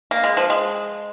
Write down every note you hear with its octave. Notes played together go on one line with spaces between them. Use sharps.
A#3
G#3
F3
G#3